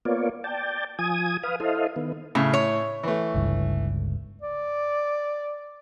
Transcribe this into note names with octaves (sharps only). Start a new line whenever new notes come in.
A#3 B3 F4 C#5 D5
D5 G5 A5
F3 G#5 D#6
B4 F5 D#6
E4 A4 C5 D#5 F5
D#3 B3
A2 C#3
C#5
E3 A3
G1 C#2 G2
D5